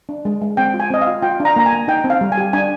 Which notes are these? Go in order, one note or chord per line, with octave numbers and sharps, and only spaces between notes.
D4
G#3
G#3
C4 G5
F4
G#5
C4 D#5
F5
F4
F4 G5
D4
A#5
A#3 A#5
G#5
A#3
D#4 G5
C4
F5
G3
G#5
G4
D4 G#5